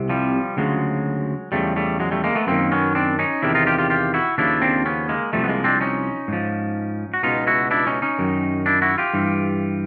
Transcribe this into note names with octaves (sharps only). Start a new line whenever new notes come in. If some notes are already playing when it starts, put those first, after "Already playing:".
Already playing: C2 C3
F3 G3
D2 C#3 F3 F#3 G#3
E2 C#3 F3 G3 A3
G3 A3
F#3 G#3
G3 A3
G#3 A#3
A3 B3
F#2 D#3 A#3 C4
B3 C#4
C4 D4
C#4 D#4
E2 C3 D#3 D4 E4
D#4 F4
F4 G4
F4 G4
F4 G4
E4 F#4
D#2 C#3 F3 D4 E4
C4 D4
B3 C#4
G#3 A#3
C2 A#2 F3 G3 A3
B3
G#3 A#3
C4 D4
C#4 D#4
G#2 F3
F#4
C#2 B2 D#4 F4
E4 F#4
D4 E4
C#4 D#4
C#4 D#4
F#2 D#3
D4 E4
E4 F#4
F4 G4
G2 E3